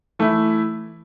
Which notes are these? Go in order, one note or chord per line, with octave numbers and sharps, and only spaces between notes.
E3 A3 E4